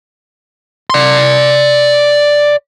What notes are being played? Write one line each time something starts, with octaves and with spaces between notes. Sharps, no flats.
D5 C6